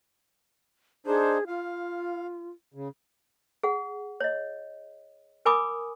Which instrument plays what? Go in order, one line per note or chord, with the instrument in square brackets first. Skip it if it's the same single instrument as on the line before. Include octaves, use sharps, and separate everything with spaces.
[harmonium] D4 D#4 C5 [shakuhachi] G#4
[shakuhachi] F4 [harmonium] F5
[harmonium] C#3
[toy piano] G#4 F#5
C#5 D#5
A#4 G#5 B5 D6 D#6